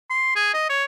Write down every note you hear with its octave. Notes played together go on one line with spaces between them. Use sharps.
C6
G#4
D#5
C#5